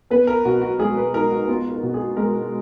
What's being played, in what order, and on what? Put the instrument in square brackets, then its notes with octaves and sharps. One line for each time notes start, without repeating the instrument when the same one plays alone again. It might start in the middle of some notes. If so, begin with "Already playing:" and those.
[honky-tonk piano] B3 [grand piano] B4
[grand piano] A#4
[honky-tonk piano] B2 [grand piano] F#4
[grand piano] F#4
[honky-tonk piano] G#3 [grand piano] G#4
[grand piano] B4
[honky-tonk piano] D#4 [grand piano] A#4
[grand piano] F#4
[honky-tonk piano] B3 [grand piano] F4
[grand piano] A#4
[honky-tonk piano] B2
[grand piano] G#4
[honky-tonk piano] G#3 [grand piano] A#4